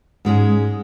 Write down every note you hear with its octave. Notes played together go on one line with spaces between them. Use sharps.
G#2 G#3 C#4 G#4